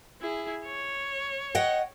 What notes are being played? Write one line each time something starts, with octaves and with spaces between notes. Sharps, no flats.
E4 G#4
C#5
D#5 F#5 G5